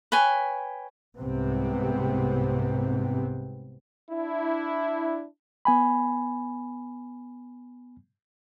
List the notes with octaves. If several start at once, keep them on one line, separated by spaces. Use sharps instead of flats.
B4 C#5 G5 G#5
C2 G#2 C3 B3 C4
D4 E4
B3 G#5 B5